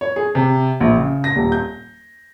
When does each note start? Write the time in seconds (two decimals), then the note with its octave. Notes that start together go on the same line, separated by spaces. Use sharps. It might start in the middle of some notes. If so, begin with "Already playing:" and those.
0.01 C#5
0.16 G#4
0.35 C3
0.80 A#1
0.96 C#3
1.24 A#6
1.36 D#1
1.52 G6